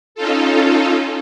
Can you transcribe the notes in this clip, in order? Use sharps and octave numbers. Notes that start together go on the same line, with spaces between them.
C#4 D#4 F4 A4